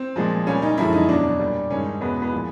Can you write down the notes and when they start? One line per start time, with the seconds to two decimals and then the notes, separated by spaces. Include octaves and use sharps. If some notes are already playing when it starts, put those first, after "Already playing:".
Already playing: C4
0.16 A#2 F3 G#3
0.47 A#2 G3 C#4
0.62 D#4
0.78 F#2 D3 F3 G#3 E4
0.93 D#4
1.08 E2 B2 F#3 D4
1.39 A#2 G3
1.70 G2 D#3 G#3 C#4
2.01 E2 B2 G#3 B3
2.22 B3
2.32 A#2 F3 G#3